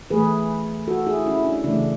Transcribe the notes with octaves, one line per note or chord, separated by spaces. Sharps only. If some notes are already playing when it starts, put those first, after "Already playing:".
E3 A3 G#4 B4
F#4 A4
E4 G#4
C#4 E4
D4
C#3 E3 A3 D4